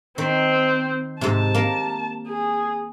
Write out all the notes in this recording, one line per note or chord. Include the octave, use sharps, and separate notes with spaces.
D#3 C4
G#2 C3 A5
A#3 A#4
G#4